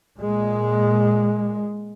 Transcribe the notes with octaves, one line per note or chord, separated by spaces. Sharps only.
A#2 G#3